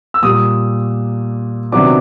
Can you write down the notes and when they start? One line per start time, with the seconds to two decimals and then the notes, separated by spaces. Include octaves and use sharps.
0.14 E6
0.22 A#2 G3 A#3 D#6
1.72 C3 D#3 F#3 B3 D4 D6